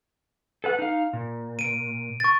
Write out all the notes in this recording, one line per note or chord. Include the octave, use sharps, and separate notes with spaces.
A4 B4 F#5
D#4 F5
A#2
D7 D#7
C#6 A6